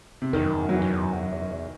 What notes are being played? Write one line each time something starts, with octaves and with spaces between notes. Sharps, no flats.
C3
E2 D#3
F#2
E2
F#2
F#3
E2 E3
F#2
E2
F#2
E2
F#2
E2
F#2
E2